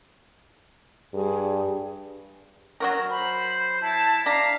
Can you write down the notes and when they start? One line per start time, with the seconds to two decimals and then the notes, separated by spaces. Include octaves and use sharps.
1.14 G2 G#4
2.80 F#3 F#4 A#4
3.10 C5 B5
3.82 E4 A5
4.26 D4 F5 A#5 B6